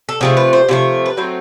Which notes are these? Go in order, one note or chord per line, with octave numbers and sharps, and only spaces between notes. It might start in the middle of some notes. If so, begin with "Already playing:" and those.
A4
C3 F3 A3 G#4
B4
C5
C3 F3 A3 C#5
B4
F#3 A3 C4 C5